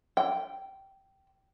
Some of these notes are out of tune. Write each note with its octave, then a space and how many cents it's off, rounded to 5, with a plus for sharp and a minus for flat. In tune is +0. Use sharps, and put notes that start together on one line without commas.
G5 -15